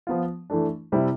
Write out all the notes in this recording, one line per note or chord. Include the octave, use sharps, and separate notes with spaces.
F3 B3 F4
E3 A3 D4
C3 G3 C4 E4